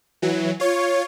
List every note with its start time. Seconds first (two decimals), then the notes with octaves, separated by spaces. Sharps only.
0.22 E3 F#3
0.60 F4 C#5